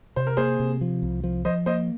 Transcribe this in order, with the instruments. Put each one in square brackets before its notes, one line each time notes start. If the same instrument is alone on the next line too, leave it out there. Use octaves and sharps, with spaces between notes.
[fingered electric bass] C3 [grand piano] C5
[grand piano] A#4
[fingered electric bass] A#3 [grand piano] G#4 C5
[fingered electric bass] C3
F3
C2
F3
[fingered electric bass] F3 [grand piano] C5 D#5
[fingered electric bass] A#3 [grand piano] C5 D#5